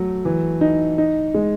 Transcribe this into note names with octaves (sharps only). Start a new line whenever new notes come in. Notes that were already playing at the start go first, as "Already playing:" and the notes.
Already playing: F#3 A3
E3
D#4
D#4
G#3